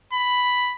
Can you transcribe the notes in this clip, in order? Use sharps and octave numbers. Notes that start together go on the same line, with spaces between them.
B5